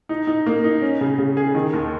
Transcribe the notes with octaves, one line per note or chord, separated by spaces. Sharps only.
D#4
D#4
A#3
D#4
C#4
C#3
C#3
G#4
D#3
D#2